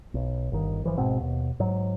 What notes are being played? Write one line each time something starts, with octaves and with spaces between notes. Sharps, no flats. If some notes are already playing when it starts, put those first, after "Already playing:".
B1
G1 D#3
G1 E3 F3
G#1 G#2 B2 C4
D#2 B2
G#2 F#3